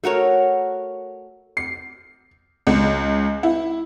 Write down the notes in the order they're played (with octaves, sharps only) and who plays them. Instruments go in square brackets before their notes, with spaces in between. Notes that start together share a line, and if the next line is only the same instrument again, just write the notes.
[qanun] A3 F#4 A#4 C#5
[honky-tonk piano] C7
C#2
E4